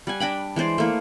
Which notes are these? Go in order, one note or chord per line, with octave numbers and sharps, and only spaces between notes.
G3 F#5 G#5
D4 G5 B5
E3 G#3 C5 D5
A3 A#3 E4